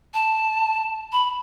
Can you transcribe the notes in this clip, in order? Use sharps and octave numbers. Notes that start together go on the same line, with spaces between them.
A5
B5